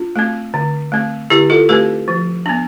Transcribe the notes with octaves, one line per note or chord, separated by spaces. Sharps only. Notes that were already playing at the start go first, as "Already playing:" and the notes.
Already playing: D4 F4
A3 C4
D3
A3 C4
D3 E4 G4
F4 A4
A3 C4 G4 B4
F3
B3 D4